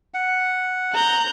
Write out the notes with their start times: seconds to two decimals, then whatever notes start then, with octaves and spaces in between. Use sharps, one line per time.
0.14 F#5
0.93 A#5 F#6 G6